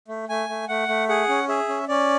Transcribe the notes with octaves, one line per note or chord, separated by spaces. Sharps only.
A3
A3 G#5
A3
A3 F#5
A3
G#4 F#5
C#4
G#4 E5
C#4
C#4 D5